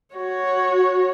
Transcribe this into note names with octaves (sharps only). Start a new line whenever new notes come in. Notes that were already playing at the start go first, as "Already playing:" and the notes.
F#4 C#5